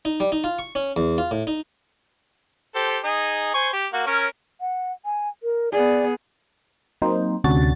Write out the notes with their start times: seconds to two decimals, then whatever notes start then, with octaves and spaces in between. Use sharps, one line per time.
0.05 D#4
0.20 G3
0.32 D#4
0.44 F4
0.59 C#6
0.75 C#4
0.97 E2
1.18 F4
1.31 A2
1.47 D#4
2.76 G4 A4 C5
3.04 D#4 G#4
3.54 C5 G#5 C#6
3.73 G4
3.93 A#3 F#4
4.07 C#4 A#4 C#5
4.60 F#5
5.05 G#5
5.43 A#4
5.72 B3 G#4 D5
7.02 F#3 A#3 C4 D#4 C5
7.44 D2 C3 C#4 D4 F#4 A6